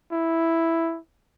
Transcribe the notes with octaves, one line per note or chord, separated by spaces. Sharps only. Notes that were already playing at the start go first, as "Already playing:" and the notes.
E4